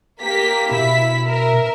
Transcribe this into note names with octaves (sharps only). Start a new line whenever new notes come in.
A#3 G4 B6
B2 E4 E5 B6
A#4 E5